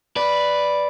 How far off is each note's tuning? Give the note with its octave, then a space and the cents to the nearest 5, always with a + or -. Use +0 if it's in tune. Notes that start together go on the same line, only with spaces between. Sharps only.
B4 +0 D5 +0